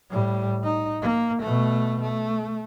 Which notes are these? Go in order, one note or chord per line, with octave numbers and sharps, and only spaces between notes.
A2 G3
D#4
A#3
B2 A3
A3